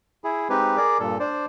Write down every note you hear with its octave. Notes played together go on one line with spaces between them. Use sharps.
E4 G#4
G#3 C4 D#4 G4 B4
G#4 A#4 D5 D6
G2 A#2 A4
D4 C5 D5